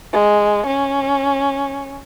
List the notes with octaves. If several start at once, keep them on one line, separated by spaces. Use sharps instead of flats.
G#3
C#4